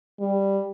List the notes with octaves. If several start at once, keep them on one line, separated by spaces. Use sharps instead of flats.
G3